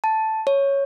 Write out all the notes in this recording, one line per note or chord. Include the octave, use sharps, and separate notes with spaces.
A5
C#5